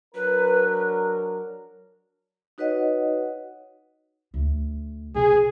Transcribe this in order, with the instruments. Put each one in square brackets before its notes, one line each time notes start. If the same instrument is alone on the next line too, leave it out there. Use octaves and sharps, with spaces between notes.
[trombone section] F#3 D4 A#4 [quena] B4
[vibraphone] D#4 F#4 B4 C#5 D#5 F#5
[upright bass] D2
[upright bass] B2 [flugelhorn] G#4